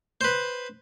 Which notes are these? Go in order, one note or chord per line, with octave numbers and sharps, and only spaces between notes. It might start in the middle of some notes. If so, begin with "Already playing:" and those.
B4 C5